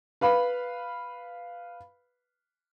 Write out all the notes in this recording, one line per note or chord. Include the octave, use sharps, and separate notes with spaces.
B4 F5 B5